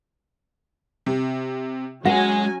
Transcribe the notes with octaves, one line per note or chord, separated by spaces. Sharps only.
C3
F#3 G#3 C#4 F#5 G#5 A#6